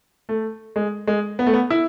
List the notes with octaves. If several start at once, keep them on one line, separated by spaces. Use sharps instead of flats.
A3
G#3
G#3
B3
A3
B3
E4